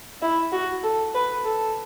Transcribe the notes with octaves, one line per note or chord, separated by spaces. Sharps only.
E4
F#4
A4
B4
A4